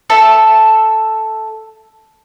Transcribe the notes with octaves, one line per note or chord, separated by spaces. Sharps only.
A4 E5 A5